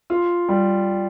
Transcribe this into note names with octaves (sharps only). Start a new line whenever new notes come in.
F4
G3